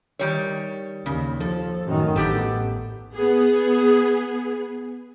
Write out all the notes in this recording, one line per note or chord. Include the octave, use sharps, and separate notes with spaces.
D#3 G3 C#5
D#2 C#3
F3 A4
F#2 A2 D#3
A1 B3 G4 A4
B3 G#4